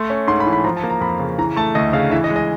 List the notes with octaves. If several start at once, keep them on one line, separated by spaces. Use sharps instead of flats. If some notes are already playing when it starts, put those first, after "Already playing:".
Already playing: A3 C6
C#4
G#2 C6
B5
E3
B5
F3 A#5
A5
A#3
A#5
F2 B5
C#3
E3 A#5
A3 A5
D2 D#5
C#3 F5
E3 E5
D#5
G#3
D#5